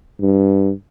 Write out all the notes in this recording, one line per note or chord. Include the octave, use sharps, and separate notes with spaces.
G2